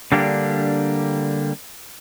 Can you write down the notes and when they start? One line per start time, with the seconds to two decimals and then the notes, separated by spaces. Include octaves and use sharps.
0.12 D3 G3 A#3 D4 G4